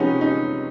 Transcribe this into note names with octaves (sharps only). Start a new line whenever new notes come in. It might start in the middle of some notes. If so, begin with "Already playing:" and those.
Already playing: C3 F3 G#3 B3 C#4 D#4
C#4 D#4